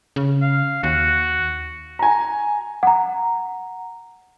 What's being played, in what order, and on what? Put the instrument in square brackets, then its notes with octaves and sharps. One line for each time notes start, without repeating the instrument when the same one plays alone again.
[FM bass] C#3
[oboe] F5
[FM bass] D#2 [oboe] F#4
[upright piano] G#5 A#5
[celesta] F#5 A#5